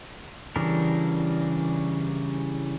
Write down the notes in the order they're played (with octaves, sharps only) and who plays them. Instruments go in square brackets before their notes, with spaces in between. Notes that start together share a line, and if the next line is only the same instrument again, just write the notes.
[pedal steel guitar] C#3 E3 G3 D4 A#4